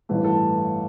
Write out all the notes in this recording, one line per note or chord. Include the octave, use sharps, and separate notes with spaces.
A1 G2 E3 A3 B4
A4